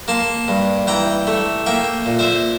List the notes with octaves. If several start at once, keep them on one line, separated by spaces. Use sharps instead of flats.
A#3 A5 C6
G2
E3 G5 A#5
A3
A#3 E5 G5
A#2
C5 E5